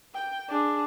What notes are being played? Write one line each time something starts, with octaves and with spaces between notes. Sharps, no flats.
G5
D4 G#4